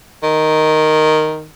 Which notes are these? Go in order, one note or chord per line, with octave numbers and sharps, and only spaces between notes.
D#3